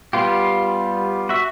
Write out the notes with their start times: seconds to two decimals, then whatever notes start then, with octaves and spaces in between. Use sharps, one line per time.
0.13 G3 B3 F4 G4
1.29 F#4 E5